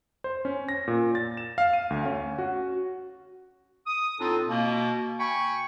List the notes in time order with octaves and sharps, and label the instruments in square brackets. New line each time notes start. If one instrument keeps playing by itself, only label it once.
[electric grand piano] C5
C#4
A#6
A#2
A6
E7
F5
D#7
D2
C#4
F#4
[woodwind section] D#6
A2 C4 D4 D#4 F4 A4
B2 A#3
G5 G#5 B5 C#6